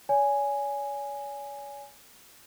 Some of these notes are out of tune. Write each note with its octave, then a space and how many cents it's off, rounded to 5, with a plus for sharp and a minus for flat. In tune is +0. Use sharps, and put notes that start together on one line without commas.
C#5 +40 G#5 +0